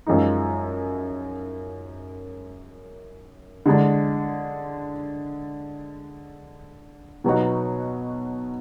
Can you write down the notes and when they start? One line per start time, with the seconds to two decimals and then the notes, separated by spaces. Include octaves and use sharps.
0.07 F#2 F3 G#3 D#4
3.66 D3 G#3 D4
7.24 B2 F#3 B3 D#4 F#4